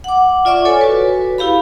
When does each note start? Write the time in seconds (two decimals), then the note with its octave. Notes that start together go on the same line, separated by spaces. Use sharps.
0.04 F#5 D6
0.45 F4 D5 E5 C#6 D6
0.65 A4 C#5 G#5
0.81 F#4 B4
1.38 E4 G4 F5 B5